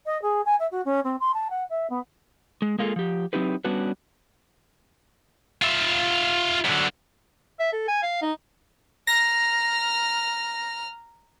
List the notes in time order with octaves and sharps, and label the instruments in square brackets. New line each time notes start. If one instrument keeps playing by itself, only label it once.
[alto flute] D#5
G#4
G#5
E5
F#4
C#4
C4
C6
A5
F#5
E5
B3
[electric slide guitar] G#3
G#3 A#3 F4 G#4 A4
F3 G4
F#3 C4 D#4 E4 G4 B4
G3 B3 C#4 D4 F#4 B4
[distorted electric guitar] F4 E5
F#2 D3
[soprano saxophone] E5
A4
G#5
F5
D#4
[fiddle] A#5 F6 [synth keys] A#6